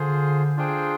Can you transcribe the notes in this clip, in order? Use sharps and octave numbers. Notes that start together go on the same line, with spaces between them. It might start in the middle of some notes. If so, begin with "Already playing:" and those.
Already playing: D3 F4 G#4 C5
D4 F4 G#4 C5 G5